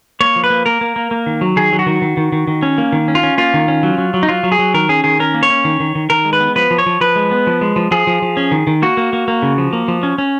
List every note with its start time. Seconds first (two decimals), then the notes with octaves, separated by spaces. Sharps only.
0.21 A#3 C#5
0.36 F3
0.44 B4
0.50 A#3
0.66 A#3 A#4
0.81 A#3
0.96 A#3
1.11 A#3
1.26 D#3
1.41 F#3
1.56 D#3 G#4
1.72 F#3
1.79 F#4
1.86 D#3
2.02 D#3
2.17 D#3
2.32 D#3
2.47 D#3
2.63 C#4
2.78 A#3
2.92 D#3
3.08 C#4
3.15 F4
3.23 C#4
3.38 A#3 F4
3.54 D#3
3.68 C#4
3.83 F#3
3.98 F#3
4.14 F#3
4.23 D#4
4.28 F#3 F4
4.43 F#3
4.52 G#4
4.59 F#3
4.74 D#3 A#4
4.89 C#4 G#4
5.04 D#3 G#4
5.19 C#4 A#4
5.34 A#3
5.43 C#5
5.50 C#4
5.65 D#3
5.80 D#3
5.95 D#3
6.10 D#3 A#4
6.25 G#3
6.33 B4
6.40 B3
6.56 F3 B4
6.71 F3
6.78 C#5
6.86 F3
7.01 F3 B4
7.16 G#3
7.31 B3
7.47 F3
7.61 G#3
7.76 F3
7.91 F3 G#4
8.07 F3
8.22 F3
8.37 C#4
8.52 D#3
8.67 D#3
8.82 A#3 F#4
8.97 A#3
9.13 A#3
9.28 A#3
9.42 C#3
9.58 F3
9.73 A#3
9.88 F3
10.03 C#4
10.18 C#4